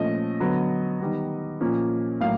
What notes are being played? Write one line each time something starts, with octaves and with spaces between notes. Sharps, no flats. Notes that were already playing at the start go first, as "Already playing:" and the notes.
Already playing: A#2 F3 A3 C#4 D#5
D3 F#3 B3
D#3 G3 B3
A#2 F3 A#3 C#4
A2 F#3 A#3 F5